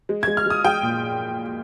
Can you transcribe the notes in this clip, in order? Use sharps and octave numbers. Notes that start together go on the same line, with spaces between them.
G#3
G#3 G#6
F6
G#3 D#6
G#3 G5
A#2